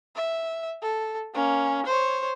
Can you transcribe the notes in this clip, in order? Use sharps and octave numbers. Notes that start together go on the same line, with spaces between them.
E5
A4
A#3 C#4
C5 C#5